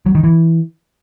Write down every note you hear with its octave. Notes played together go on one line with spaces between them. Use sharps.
F#3
D#3
E3